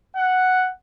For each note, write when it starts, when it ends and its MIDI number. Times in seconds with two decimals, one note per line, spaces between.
0.16 0.69 78